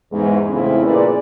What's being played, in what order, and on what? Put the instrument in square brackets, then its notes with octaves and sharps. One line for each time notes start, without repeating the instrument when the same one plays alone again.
[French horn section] E2 G#2
F2 A2 C#3 C4 E4
A#2 G#4 B4 D5